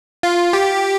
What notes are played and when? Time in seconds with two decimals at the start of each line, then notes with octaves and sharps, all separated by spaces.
0.23 F4
0.53 G4